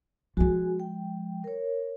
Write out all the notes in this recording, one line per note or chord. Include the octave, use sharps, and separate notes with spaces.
F3 G#3 F#4 G#4 G#5
G5
A#4 C#5